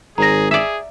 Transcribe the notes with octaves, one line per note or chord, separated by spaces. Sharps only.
G#1 G#4 A#5 A#6
G#4 D5 E5